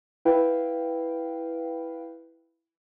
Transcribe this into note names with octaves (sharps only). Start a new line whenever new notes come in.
E4 B4 F5 G5